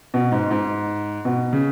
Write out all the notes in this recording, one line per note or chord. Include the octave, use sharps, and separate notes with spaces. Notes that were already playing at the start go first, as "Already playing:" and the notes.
B2
G#2
G#2
B2
C#3